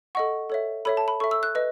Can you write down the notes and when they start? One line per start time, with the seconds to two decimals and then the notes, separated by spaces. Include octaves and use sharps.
0.15 A4 D#5 F#5 C#6
0.50 A4 C#5 E5
0.85 A4 C#5 E5 B5
0.97 A5
1.08 B5
1.20 A4 E5 C#6
1.31 E6
1.43 F#6
1.55 B4 D#5